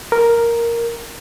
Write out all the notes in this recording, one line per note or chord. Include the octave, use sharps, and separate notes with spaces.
A#4